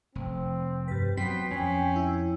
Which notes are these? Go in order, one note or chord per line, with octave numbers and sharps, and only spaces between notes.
F1 C4
G2 B4
F#3 B3 C4 G5 B6 C7
F2 C#4 G5
E4